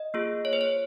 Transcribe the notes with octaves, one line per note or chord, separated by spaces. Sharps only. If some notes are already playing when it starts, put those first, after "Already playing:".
Already playing: D#5
A#3 F4 G#4
C#5
C5
C#5